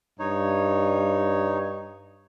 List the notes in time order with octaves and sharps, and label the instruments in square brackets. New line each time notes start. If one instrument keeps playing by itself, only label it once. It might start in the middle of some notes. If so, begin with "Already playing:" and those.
[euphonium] G2 [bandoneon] D#4 C#5